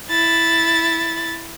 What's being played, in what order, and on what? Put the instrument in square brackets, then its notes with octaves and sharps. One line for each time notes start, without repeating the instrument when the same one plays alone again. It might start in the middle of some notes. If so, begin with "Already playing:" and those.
[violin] E4 A6